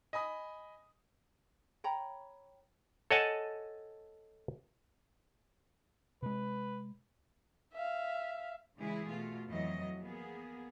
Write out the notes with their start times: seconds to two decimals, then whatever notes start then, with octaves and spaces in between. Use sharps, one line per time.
0.13 D#5 G#5 B5 D#6
1.84 C#5 G5 A#5 B5
3.11 A4 C#5 D#5 F#5 G#5 A5
6.22 C3 G#3 B4
7.73 E5 F5
8.78 C#3 E3 G#3 E4 G#4
9.07 B2 A3 F4
9.48 F2 E3 F#3 D#5
9.99 A#3 B3 G#4